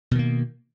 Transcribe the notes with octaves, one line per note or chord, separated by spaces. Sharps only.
B2 D#3 A#3